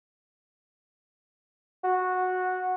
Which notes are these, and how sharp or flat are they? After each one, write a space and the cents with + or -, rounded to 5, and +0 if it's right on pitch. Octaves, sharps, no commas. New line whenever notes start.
F#4 -10